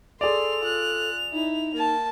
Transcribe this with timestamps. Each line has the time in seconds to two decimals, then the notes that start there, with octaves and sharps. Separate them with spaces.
0.21 G#4 A4 D5 C6 F7
0.61 F4 F#6
1.33 D#4 E4
1.74 A#3 A5